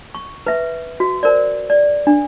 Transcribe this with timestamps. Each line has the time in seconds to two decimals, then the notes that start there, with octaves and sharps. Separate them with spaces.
0.15 C#6
0.47 B4 E5
1.00 F#4
1.23 A#4 C5 D5
1.70 D5
2.07 D4